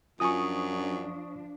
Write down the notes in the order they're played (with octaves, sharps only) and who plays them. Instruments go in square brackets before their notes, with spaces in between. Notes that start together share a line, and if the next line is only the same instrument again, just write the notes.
[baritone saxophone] F#2 [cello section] F3 D4 [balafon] F4 G#5 [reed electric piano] C#6 D#6